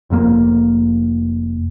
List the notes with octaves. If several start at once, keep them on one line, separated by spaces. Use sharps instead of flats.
F1 F2 A2 A#3